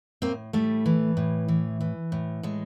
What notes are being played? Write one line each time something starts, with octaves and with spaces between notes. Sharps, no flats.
A2 A#3 C4
A2 G3 A3
E3
A2
E3
E3
A2
A2 G#3